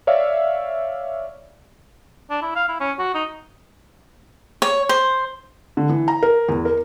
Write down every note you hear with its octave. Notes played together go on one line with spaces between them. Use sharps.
C#5 D5 E5 F5
D4
E4
F5
E4
C#4
F#4
D#4
C#5
C5
D3
E3
A#5
A#4
E2
A#4